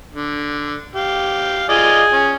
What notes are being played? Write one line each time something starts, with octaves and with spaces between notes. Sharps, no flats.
D3
G4 F5
F4 G#4 D5 D#5
C#4